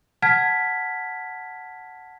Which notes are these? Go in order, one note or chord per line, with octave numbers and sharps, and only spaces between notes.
F#5 A5 F6 G#6 B6